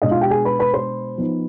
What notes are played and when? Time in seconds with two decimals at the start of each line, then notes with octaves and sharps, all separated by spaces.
0.02 B2 G#3 B3 D4 D#5
0.11 F4 F5
0.21 G4 G5
0.30 G#4 G#5
0.45 B4 B5
0.59 B4 B5
0.74 C5 C6
1.18 F3 B3 D#4